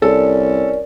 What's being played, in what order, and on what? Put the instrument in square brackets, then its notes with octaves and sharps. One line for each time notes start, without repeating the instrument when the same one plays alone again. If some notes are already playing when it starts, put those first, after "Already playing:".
[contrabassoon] C2 [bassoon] C#4 [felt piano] A4 [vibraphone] A#4 D5